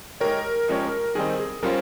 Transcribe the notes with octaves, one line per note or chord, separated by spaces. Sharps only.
G#3 D#4 G4 A#4 C#5
F3 G#3 C#4 G4 C#5
D#3 G3 C4 D#4 G#4
G#4
G3 C#4 F4 A#4 C5